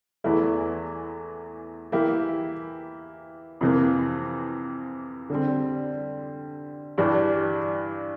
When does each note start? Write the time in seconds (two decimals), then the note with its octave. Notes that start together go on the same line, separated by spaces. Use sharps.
0.24 E2 E3 A3 E4
1.92 E3 A#3 E4 G4
3.61 F2 C3 E3 A#3
5.30 D3 G3 C4
6.98 G2 E3 G3 D4 G4